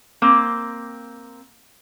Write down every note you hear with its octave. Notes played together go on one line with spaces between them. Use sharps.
A#3 C4